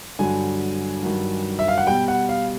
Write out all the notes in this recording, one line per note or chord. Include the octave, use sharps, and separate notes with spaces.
G2 D3 F#3 G#5
G2 D#3 F#3
E5
F5
F#5
B2 G3 G5
F#5
F5